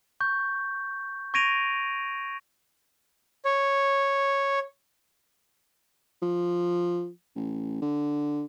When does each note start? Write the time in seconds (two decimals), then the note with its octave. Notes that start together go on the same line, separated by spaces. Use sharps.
0.20 C#6 G6
1.34 C#6 G#6 A#6 D7 D#7 F7
3.45 C#5
6.22 F3
7.35 A1
7.82 D3